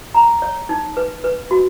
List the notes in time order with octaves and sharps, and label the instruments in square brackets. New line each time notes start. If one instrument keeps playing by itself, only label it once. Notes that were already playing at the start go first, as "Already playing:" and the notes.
[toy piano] A#5
C#5
D#4
B4
B4
F#4